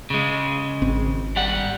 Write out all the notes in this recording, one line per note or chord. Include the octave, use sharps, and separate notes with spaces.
C#3 G#3
G#1 C4
G3 F#5